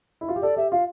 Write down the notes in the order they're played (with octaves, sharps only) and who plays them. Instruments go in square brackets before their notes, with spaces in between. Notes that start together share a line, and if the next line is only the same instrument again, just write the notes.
[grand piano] E4
F4
G4
[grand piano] A4 [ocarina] D5
[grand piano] G4 [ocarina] E5
[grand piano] F4 [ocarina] F5